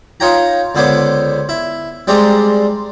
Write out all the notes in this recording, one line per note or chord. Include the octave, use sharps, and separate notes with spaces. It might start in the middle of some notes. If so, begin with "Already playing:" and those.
D#4 F4 C#5 G5 A#5
C#2 D3 B3 C5 C#5 D6
E4
G3 G#3 C4 D4 A#5 C6